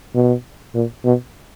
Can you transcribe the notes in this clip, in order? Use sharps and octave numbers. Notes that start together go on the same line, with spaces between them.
B2
A#2
B2